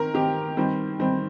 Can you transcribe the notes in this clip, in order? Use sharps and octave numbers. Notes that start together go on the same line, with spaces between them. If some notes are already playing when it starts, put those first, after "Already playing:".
Already playing: D#3 C4 A#4
D#3 C4 G4
D#3 G3 C4
D#3 G3 C4